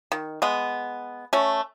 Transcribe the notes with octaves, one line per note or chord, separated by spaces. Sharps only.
D#3
G#3 B3
A3 C#4